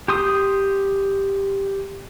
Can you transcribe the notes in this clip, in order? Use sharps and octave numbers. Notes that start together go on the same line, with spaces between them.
G4 C6 D#6